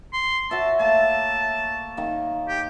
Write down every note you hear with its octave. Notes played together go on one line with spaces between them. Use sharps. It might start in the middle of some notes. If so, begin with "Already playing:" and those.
C6
F#4 C#5 E5 A5
A3 A#3 A5
D#3 A#3
G4